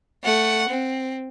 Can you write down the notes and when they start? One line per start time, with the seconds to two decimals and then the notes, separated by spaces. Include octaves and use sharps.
0.24 A3 F#5
0.69 C4